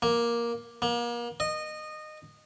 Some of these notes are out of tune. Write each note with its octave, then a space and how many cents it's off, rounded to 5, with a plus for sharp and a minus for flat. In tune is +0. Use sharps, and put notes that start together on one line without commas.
A#3 +10
A#3 +35
D#5 -20